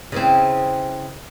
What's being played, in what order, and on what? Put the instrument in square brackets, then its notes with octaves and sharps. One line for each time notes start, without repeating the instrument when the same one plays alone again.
[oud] C#3 E3 C4